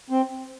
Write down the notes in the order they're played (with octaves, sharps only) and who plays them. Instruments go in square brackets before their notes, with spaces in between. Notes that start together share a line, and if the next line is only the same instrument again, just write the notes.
[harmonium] C4